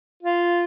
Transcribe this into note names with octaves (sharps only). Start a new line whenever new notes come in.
F4